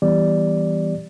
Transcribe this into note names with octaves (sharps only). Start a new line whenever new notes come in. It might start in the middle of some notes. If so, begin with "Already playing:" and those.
E3 G3 B3 G4 D5